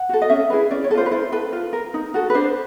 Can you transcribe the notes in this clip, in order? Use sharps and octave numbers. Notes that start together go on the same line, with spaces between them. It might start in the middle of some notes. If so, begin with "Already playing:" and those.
Already playing: F#5
F#4 A4
D#5
C#4 E5
E4 G#4 B4
C#4 D5
C#5
A4
F4 C5
B4
E4 C5
A4 B4
F4
A#4
D#4
F#4 A4
B4
D4 C5